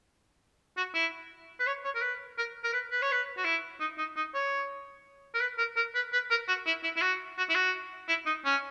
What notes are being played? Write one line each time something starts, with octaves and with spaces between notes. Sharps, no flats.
F#4
E4
B4
C#5
C#5
A#4
B4
A#4
A#4
B4
B4
C#5
B4
F#4
E4
D#4
D#4
D#4
C#5
A#4
B4
A#4
A#4
B4
B4
A#4
F#4
E4
E4
E4
F#4
F#4
E4
F#4
E4
D#4
C#4